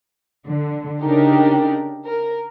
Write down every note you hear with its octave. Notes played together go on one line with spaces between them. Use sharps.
D3
C#3 D4 D#4 G4 A#4
A#4